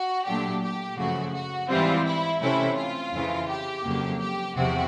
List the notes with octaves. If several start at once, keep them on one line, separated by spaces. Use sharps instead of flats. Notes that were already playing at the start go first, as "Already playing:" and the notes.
Already playing: F#4
A#2 F#3 A3 D4 G4
G4
F#2 C#3 F3 A3 F#4
F#4
G#2 E3 G3 C4 F4
E4
C3 E3 A3 C#4 E4
F4
F2 C#3 E3
G4
F2 C#3 F#3 A#3
G4
E2 C3 F3 F#4